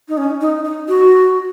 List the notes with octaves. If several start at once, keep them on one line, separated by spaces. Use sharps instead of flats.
D#4
C#4
D#4
D#4
F#4